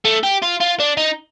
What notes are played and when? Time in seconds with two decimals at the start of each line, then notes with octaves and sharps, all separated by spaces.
0.05 A3
0.24 G4
0.43 F4
0.61 F4
0.80 D4
0.97 D#4